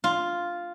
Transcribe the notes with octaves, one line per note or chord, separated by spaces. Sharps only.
F4